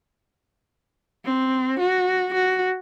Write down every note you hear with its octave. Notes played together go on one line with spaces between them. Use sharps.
C4
F#4
F#4